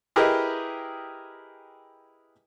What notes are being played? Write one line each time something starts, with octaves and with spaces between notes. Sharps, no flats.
E4 G4 G#4 A#4 B4 D#5